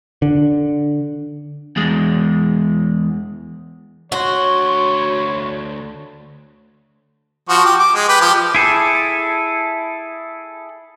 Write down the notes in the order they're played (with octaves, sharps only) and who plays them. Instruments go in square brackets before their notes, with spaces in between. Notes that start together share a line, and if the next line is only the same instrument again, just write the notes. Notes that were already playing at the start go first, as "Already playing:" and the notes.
[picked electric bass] D3
[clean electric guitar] E2 G#3
[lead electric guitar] D2 C6 [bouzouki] F#4 [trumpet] C#5
[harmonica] F3 F#4
G4
D6
G#3
G4 B4
F3 G4
[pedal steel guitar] E4 G#4 A4